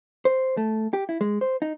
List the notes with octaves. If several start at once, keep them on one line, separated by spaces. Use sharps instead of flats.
C5
A3
G4
E4
G#3
C5
D#4